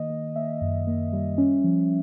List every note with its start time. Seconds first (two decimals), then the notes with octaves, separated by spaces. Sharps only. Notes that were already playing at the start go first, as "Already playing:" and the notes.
Already playing: D#3 A#3 D#5
0.10 A#3
0.36 A#3 E5
0.61 F#2
0.87 A#3
1.13 G3
1.38 C#4
1.64 F3